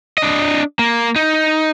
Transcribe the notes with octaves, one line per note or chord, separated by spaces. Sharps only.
D4 D#5
A#3
D#4